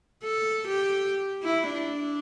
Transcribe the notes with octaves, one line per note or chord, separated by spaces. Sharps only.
A4
G4
E4
D4